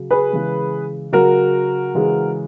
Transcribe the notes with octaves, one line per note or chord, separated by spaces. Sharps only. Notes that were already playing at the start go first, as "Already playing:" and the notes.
Already playing: C#3 F#3
G#4 B4
C#3 E3 G#3
C#3 F#3 F#4 A#4
C#3 E3 G#3